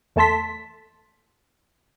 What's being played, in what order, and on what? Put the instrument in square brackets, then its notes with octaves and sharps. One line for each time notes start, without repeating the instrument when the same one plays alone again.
[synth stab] E2 A3 A4 A5 C6 B6